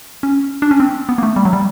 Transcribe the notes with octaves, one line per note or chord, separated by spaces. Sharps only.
C#4
D4
C#4
C4
B3
A#3
A3
G3
F#3
G3